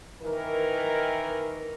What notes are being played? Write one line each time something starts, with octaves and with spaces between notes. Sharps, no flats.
D#3 E3 A#4